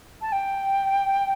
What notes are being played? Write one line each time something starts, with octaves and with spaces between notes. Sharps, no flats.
A5
G5